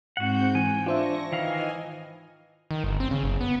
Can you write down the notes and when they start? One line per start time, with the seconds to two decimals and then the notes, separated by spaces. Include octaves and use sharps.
0.17 G#2 C4 F#4 F#5 G6
0.55 G#2 E3 G5 G#5
0.86 D4 F4 C5 E5 C#6 A#6
1.32 D#3 E3 D#5 F5 G#5
2.71 D#3
2.84 G1
3.00 C4
3.11 C#3
3.24 F#1
3.41 B3